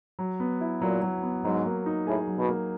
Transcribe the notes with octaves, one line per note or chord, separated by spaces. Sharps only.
F#3
B3
E4
A#2 F#3
F#3
B3
G#2 F#3
A#3
D#4
A2 G#4
F#3
B2
A#3